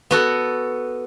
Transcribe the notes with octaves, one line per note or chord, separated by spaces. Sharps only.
B3 F#4 A4